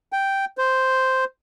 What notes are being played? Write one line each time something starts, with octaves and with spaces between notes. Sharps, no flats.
G5
C5